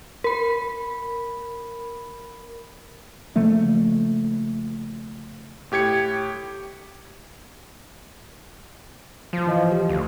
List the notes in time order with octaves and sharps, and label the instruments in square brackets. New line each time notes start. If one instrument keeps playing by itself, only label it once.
[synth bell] A#4 B5
[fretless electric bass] C#3 F3 A3 A#3
[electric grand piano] A2 G4 G#6 C#7
[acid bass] F3
[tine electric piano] G#1 E3 D#5
G4
[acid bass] D2